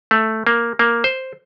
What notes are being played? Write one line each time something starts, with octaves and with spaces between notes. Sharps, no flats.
A3
A#3
A#3
C5